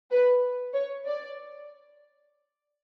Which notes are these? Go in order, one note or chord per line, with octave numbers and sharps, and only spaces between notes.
B4
C#5
D5